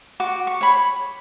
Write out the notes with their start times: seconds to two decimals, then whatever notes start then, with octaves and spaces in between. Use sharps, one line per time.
0.20 F#4 D6
0.47 C#6
0.61 C#5 B5